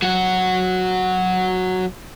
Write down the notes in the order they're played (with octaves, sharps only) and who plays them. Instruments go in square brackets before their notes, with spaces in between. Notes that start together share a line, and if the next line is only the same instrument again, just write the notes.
[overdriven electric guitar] F#3 F#4